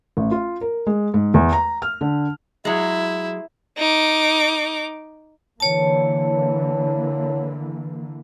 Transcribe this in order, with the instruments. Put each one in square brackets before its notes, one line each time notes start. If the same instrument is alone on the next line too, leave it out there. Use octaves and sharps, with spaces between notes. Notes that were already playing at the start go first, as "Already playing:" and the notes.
[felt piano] A1
F4
A#4
G#3
G#2
E2
A#5
F6
D3
[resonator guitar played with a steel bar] F#3 G#3 [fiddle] E4
[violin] D#4 D6
[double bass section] D3 E3 A#3 [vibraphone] C#5 A5